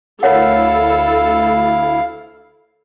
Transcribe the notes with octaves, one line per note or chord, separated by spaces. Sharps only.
D2 E4 A4 A#4 C#5 F5 F#5